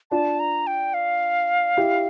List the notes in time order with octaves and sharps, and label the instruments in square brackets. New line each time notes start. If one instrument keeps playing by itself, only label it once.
[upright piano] D4 F4 [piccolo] A5
[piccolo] A#5
G5
F5
[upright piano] E4 G4